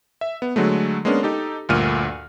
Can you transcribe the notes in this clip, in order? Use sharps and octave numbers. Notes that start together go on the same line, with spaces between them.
E5
B3
D3 F#3 G#3 A3
G#3 A#3 B3 C#4 D4
D#4 G4 A4
D2 G2 A#2 F6 D#7